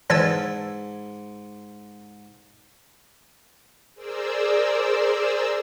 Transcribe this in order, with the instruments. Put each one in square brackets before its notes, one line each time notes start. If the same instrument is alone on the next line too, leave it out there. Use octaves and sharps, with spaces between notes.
[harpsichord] G#2 [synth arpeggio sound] E3 E6 A6 [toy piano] D5 A5
[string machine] G#4 A#4 C5 D5 E6